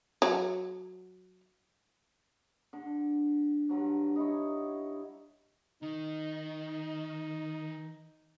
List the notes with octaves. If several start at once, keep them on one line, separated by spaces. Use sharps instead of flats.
F#3
D3
G2 D3 F#3 D4
D#4 E4 C#5
D#3 D#4